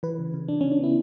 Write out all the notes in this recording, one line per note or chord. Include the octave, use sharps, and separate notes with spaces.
E3 B4
C#3
C#3
C#3 D4
C#4
C#3
D4
B3 E4